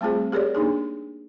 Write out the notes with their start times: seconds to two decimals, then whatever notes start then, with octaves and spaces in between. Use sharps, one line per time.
0.01 G3 A3 C4 F4 G#4 C5
0.32 G4 G#4 A#4 C#5 D5
0.55 A#3 D4 D#4 G#4